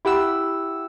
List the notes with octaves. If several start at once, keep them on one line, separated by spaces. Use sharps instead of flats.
E4 G4 F#5 E6